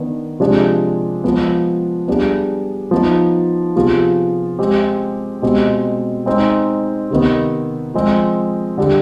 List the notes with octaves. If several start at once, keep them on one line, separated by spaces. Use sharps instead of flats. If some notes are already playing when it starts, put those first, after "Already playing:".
Already playing: D#3 B3 D4
C3 F3 G#3 D4 G#4
F3 G#3 B3
G3 B3 D4 G#4
F3 B3 D#4
C3 F3 B3 F4 G#4
G#3 C4 G4
B2 G#3 C4 G4
G#3 C4 D#4
C3 D#3 B3
F3 G#3 C4
D3 G3 D4 G4